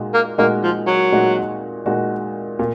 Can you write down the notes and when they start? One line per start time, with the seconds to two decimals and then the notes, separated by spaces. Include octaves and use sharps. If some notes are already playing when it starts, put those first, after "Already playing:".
Already playing: A#2 G#3 D#4 F#4
0.14 A#3
0.38 A#2 G#3 A#3 D#4 F#4
0.63 F3
0.87 F#3
1.12 A#2 G#3 D#4 F#4
1.86 A#2 G#3 D#4 F#4
2.59 A#2